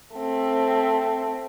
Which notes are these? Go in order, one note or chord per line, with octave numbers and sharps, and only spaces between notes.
A3 C4